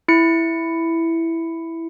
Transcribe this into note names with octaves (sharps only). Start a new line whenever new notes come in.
E4 C#7